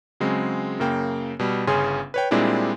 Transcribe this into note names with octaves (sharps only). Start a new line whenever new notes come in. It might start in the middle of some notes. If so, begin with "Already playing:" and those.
C#3 F#3 G#3 C4
F#2 C#3 A#3 G5
B2 G3
G1 C#3 C#4 G#4 G#5 C6
B4 C#5 G5
A#2 G3 G#3 C4 D4 E4